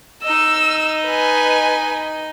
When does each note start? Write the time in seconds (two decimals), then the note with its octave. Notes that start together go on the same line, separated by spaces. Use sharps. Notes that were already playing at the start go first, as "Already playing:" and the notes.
0.24 D#4 D#5 E6
1.05 B4 G#5